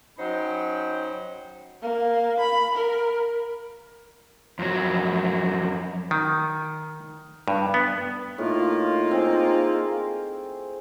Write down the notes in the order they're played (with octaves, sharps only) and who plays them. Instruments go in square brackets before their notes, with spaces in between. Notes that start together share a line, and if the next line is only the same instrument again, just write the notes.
[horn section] F#3 C#4 D#4 C5 G5 B5
[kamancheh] A#3
B5
A#4
[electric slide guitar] F2 F#3
[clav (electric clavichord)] D#3
G2
B3
[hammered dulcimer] A2 [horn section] A#3 D#4 F4
[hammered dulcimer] C4 G#4